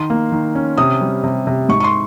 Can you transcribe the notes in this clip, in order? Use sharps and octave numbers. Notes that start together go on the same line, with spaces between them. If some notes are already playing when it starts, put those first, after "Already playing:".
Already playing: D#3 C6
A#3
D#3
C#4
C3 D#6
G3
C3
C3
G#2 C#6
C#6
C6